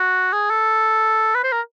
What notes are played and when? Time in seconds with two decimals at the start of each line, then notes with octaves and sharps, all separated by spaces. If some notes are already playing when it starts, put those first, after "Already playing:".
Already playing: F#4
0.33 G#4
0.50 A4
1.35 B4
1.44 C5
1.52 A#4